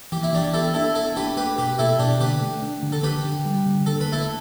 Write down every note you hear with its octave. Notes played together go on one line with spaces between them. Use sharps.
E3 G4
E4
E3 D4 G4
B3 E4 A4
D4 E4 A4
B3 E4 A4
D4 G4 B4
A3 G4 B4
B2 G4 B4
B2 E4 A4
B2 D4 G4
D3 G4 B4
A3
D4
D3
A4
D3 G4 B4
D3
G3
D3
D3 A4
B4
A3 E4 A4